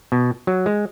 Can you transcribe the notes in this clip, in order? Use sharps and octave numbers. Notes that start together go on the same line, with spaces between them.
B2
F#3
G#3